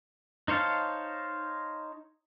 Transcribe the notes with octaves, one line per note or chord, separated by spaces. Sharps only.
D#4 C5 C#5 F5 A5